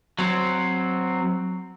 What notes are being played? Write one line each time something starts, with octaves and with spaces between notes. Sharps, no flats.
F#3 C4